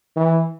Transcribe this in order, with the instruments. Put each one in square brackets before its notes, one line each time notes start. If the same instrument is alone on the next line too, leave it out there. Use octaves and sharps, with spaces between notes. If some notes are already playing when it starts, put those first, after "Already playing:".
[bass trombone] E3